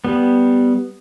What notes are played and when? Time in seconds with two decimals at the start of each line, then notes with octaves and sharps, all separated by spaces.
0.05 G3 B3